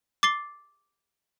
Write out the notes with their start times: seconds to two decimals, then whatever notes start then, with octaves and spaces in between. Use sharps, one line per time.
0.23 D6 A6 C7 G7